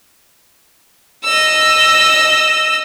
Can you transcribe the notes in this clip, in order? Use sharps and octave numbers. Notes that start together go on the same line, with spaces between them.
D#5 E6